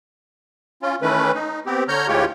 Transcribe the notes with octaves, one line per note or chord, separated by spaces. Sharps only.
C#4 F4
D#3 E3 A3 C#4 B4
D#4
B3 C4 G4
D3 C#5 A#5 F6 G6
D2 A2 G#3 F4 G4 C#5